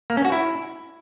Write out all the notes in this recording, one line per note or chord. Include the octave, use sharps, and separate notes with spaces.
A#3
C#4
F#4
E4